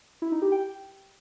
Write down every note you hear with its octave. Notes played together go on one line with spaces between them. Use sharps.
E4
D#4
G4
G5